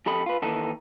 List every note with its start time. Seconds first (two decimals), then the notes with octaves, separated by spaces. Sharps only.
0.06 F2 G4 A4 D#5 B5
0.26 F4 B4
0.42 D#2 D#3 E3 D#4 A4